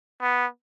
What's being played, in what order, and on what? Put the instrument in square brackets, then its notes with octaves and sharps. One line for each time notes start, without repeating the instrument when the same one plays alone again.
[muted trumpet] B3